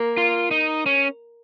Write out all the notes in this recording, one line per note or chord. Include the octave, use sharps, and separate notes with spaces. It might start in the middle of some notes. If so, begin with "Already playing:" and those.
Already playing: A#3
F4
D#4
C#4